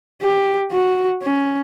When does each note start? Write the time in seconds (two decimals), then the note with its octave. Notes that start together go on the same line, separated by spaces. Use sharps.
0.22 G4
0.72 F#4
1.22 C#4